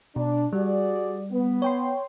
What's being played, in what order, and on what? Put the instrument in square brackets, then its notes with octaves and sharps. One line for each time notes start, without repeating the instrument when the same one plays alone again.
[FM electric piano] B2 [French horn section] D4
[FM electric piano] G3 [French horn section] F#4 G#4 D5
[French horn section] B3
[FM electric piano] C#5 G5 C6